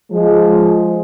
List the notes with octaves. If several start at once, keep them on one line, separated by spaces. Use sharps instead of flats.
F3 G#3